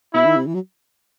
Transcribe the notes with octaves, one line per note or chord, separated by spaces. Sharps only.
B2 E4
D#3
C3
E3
F#3